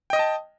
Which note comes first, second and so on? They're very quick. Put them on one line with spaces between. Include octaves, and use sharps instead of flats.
G5 D#5 D#6 A5